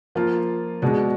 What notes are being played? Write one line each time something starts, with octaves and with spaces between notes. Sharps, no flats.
F3 A#3 F4
B2 G#3 D4